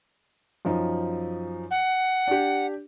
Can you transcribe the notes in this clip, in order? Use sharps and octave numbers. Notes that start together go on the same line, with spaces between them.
F#2 F3 D#4
F#5
D4 G4